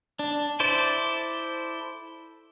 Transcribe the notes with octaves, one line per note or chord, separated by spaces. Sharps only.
D4
E4 A4 C5 D5